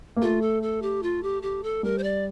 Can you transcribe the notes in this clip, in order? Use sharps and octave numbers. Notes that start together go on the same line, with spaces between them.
A#3
A3 F4
A4
A4
G4
F4
G4
G4
A4
G3 A#4
C5
D5